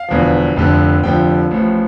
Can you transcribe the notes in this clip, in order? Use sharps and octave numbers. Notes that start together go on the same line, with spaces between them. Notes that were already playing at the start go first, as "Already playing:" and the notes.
Already playing: F5
E1 E2 D3 F3
F1 F2 D3 F3
F1 F2 D3 F3 G5
A1 A2 F3